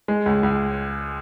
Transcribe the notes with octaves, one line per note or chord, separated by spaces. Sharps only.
G#3
C#2
C#2